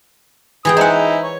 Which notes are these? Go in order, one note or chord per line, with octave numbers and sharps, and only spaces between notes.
E3 G#4 G5 D#6
D#4 E4 C5 F#5 A#5
C#5